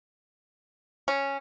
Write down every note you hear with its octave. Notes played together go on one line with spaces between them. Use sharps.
C#4